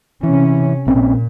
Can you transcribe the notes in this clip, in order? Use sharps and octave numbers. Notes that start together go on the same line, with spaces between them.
C3 E3 C#4
A#1 A#2 C4 C#4